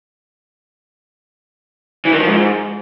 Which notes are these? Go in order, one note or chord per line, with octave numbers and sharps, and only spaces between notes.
E3
D#3
F3
G#2